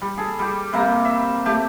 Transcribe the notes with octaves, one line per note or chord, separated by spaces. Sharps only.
G3
G#4 A4
G3 G4
C3 G3 A#3 A#5
E5
A3 G4